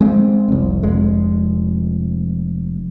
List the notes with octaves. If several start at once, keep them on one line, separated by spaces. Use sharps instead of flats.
G#3 C4
F1 C2
F1 F2 G#3